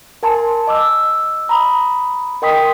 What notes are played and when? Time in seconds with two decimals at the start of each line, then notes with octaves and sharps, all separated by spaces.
0.23 A#4 G#5 A5 C6
0.67 D#5 D6 E6
1.49 A#5 B5 D#6
2.42 A#4 D#5 G5 C6 D#6 B6